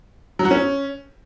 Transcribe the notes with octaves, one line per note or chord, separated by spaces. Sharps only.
F#3
F#4
C#4